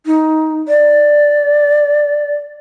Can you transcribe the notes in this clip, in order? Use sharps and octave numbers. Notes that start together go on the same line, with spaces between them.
D#4
D5